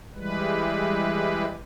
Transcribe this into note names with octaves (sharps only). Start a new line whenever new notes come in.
E3 G3 G#3 B4